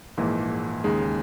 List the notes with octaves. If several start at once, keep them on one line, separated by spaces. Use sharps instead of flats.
A#1 G#2 E3 A#3
D#2 C#3 G#3 D#4